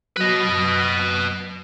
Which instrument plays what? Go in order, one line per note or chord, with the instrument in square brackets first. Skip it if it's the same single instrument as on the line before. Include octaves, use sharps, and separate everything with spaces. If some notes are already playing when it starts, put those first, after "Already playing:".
[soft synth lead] F#3 [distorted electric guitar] B4 D#5
[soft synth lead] F#2